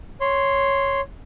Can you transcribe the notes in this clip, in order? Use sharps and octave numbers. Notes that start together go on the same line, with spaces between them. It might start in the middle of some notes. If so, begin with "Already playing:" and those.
C#5 C6